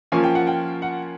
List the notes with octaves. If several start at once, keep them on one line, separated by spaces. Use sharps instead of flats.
F3 A#3 C#4 F4 G#5
G5
F#5
G5
F#5